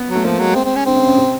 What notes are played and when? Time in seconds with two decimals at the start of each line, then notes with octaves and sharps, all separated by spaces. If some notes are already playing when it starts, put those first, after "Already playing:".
Already playing: B3
0.09 F#3
0.15 A3
0.24 F3 A#3
0.39 F#3 G#3
0.55 C4
0.65 C4
0.76 C#4
0.86 D3 C4
0.96 C#3
1.07 C#3
1.17 C3